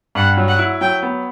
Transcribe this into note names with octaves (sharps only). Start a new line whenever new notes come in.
G2 F#5
F#3
F#5
E4
F#3 G5
B3